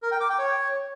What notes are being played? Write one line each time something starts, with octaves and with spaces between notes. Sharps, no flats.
A#4
G5
D6
G5
C#5